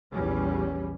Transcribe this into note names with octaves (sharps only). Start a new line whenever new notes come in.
A#1 E2 G3 C#4